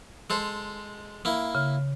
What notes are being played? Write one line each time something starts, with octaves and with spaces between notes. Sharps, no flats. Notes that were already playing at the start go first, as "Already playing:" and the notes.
G#3 A4 C5
A#3 E4
C#3